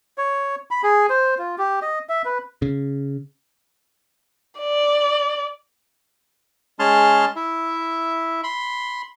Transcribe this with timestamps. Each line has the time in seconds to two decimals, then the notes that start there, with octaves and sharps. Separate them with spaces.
0.18 C#5
0.71 B5
0.83 G#4
1.10 C5
1.39 F4
1.58 G4
1.82 D#5
2.09 E5
2.25 B4
2.62 C#3
4.60 D5
6.79 G#3 C#4 G#4 A5 C6 F6
7.36 E4 E5
8.43 B5 C6